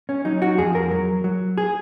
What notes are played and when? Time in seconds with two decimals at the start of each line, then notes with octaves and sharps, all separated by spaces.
0.09 C#4
0.25 F#3 D#4
0.42 F#4
0.58 F2 G#4
0.75 A#4
0.91 F#3
1.24 F#3
1.58 G#4